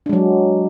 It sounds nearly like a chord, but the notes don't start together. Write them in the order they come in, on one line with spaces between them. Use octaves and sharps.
D4 G#3 F#3